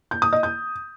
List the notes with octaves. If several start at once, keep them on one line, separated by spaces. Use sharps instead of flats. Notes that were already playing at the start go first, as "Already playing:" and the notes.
G6
D#6
D#5
G6